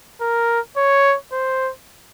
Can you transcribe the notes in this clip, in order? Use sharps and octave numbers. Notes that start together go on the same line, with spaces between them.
A#4
C#5
C5